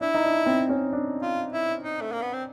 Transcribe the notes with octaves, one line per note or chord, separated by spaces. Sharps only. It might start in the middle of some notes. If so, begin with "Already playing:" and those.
D4 E4
D#4
D4
C4
C#4
D4
F4
E4
D#4
A3
A#3
B3
C4